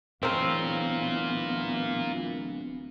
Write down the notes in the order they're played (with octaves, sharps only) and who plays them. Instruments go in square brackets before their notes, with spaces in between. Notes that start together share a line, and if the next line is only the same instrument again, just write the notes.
[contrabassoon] D1 [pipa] C#3 C4 [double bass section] E3 B3 [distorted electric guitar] F4 A#4